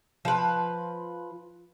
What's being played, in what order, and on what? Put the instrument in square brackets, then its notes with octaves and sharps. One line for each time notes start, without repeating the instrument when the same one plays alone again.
[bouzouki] F3 B4